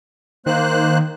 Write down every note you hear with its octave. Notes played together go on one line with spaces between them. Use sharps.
D#3 A#3 C5 F#6